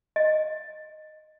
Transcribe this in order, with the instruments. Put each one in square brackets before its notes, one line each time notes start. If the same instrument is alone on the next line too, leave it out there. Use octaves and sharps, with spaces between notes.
[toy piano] D#5